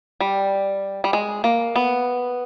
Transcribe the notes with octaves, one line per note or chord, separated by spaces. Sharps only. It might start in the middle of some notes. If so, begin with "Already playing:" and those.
G3
G3
G#3
A#3
B3